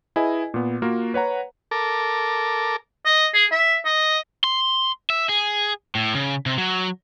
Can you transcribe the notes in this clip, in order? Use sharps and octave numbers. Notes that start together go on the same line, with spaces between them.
E4 G#4 B4 D#5 G#5
A#2 B3
A#3 F4 F#4 A#4
B4 C#5 F#5 A#5
A4 A#4 D6
D#5
G#4
E5
D#5
C6
E5
G#4
A2
C#3
C3
F#3